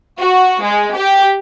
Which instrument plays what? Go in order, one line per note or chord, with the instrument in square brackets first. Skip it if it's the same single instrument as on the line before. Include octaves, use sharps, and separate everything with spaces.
[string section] F#4
G#3
G4